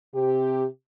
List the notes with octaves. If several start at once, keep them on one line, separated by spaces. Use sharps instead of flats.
C3 G4